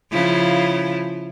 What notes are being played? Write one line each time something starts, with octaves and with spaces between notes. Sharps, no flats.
C#3 F3 E4